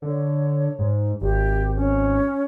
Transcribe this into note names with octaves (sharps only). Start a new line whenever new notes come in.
D3 C#5
G#2
G#1 G4
C#4